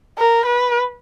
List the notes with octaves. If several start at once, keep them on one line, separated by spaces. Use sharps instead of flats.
A#4
B4